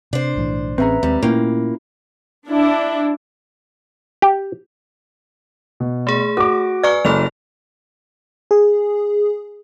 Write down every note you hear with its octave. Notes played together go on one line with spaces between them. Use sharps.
C3 D4 C5
B1 A2 E3
A1 C4 C#4 G#4 B4 E5 A#5
D#2 G3 G#3 C4
A#2 A3 A#3 C#4 E4 F4 G5
D4 E4
G4
B2
A3 G#4
F#4 A4 D6
B4 D5 G#5 A#5 C#6 F6
F#1 E4 A4 F7
G#4